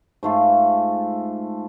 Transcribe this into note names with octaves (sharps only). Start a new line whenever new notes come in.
G#2 A3 F4